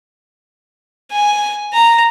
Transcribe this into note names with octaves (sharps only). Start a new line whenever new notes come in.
G#5
A#5